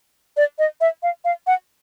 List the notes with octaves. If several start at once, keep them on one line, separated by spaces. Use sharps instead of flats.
D5
D#5
E5
F5
F5
F#5